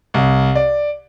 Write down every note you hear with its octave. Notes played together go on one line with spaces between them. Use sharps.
C2
D5